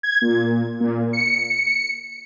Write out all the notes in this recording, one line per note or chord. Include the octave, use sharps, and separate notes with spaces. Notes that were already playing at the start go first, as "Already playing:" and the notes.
G#6
A#2
A#2
C#7